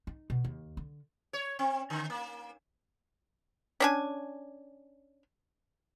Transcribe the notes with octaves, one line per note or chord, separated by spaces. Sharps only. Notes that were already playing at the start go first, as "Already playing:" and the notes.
D#4
B2
D#2
D3
C#5
C4
D3
A#3
C#4 D4 G#5